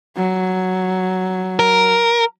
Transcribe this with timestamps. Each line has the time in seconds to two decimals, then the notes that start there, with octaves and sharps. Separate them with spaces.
0.17 F#3
1.59 A#4